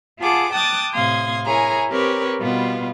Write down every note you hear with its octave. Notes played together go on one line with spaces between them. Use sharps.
F4 G#4 F#5 A5 D6
G5 A5 D6 D#6 F#6 A6
A2 C3 F5 C6 D#6 G#6
E4 G#4 A#4 C#5 G#5 A#5
C4 G4 A#4 B4 C#5
B2 G3 B3 F4